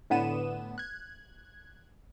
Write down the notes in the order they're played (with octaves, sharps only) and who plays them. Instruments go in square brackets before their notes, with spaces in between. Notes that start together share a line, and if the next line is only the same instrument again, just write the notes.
[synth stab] A2 D3 B3 D#7 E7
F#6 G#6